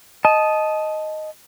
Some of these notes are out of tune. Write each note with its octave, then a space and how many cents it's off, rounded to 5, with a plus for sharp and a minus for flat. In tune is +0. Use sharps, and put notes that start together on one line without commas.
D#5 +0 A5 -20